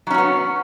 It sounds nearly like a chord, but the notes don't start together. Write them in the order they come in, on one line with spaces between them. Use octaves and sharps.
F#3 C#4 F#4 B3